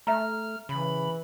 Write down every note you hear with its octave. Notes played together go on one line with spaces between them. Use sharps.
A3 E5 A#5 F6
C#3 E3 B5